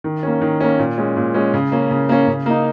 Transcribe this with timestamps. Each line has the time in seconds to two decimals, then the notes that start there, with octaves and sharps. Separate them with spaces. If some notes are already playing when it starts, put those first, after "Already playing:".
0.04 D#3
0.23 A#3 C#4
0.41 D#3
0.60 A#3 C#4
0.79 A#2
0.98 G#3 C#4
1.16 A#2
1.34 G#3 C#4
1.54 C#3
1.72 A#3 C#4
1.91 C#3
2.09 A#3 C#4
2.27 C#3
2.46 A#3 D#4